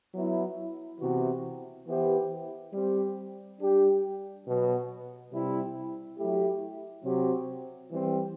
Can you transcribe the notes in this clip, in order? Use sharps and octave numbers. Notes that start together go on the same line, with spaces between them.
F#3 B3 E4
C3 E3 B3 F#4
E3 B3 E4 G4 C5
G3 C4 G4
G3 D4 G4
B2 F#3 B3
C3 G3 C4 E4
F#3 A3 E4 G4
C3 F#3 C4 G4
E3 G3 C4